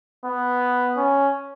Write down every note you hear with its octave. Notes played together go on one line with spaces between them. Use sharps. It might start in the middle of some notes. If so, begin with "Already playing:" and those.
B3
C#4